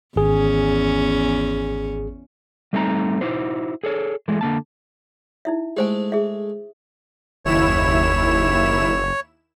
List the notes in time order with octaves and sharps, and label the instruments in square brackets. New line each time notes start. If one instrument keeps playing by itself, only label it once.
[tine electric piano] G#1 G#4 [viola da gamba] E2 C#4
[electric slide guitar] G3 A3 C4 D#4 G5 A#5
D#4 E4 F#4 C5
G#4 A4 C#5
E3 G#3 A3
D3 A#3 A5
[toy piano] D#4 E4 E5
[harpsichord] G#3 A3 [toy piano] G4 C5 G#5
[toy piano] G#4 E5
[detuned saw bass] F#1 [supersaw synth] D#2 E4 E7 [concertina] C#5